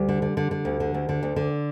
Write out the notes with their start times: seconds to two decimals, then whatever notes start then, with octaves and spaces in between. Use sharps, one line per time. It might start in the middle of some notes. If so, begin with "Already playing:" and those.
Already playing: D2 G3
0.09 D3
0.22 D3
0.37 D3
0.51 D3
0.65 D2
0.80 D3
0.94 D2
1.09 D3
1.23 D2
1.36 D3